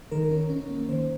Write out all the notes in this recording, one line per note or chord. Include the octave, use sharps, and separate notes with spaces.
D#3 A#4
C#4
C#4
A#3
D#3 C5